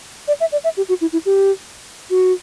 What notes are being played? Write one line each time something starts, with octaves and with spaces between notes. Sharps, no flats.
D5
E5
D5
E5
G4
F#4
E4
E4
G4
F#4